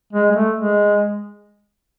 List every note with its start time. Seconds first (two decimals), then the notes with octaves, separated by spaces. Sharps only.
0.13 G#3
0.32 G#3
0.35 A3
0.57 G#3